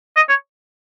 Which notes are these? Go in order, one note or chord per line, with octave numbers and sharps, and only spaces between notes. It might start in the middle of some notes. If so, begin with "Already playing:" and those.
D#5
C#5